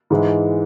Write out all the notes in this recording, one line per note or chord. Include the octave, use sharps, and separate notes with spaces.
G#2 E3 G#3 E4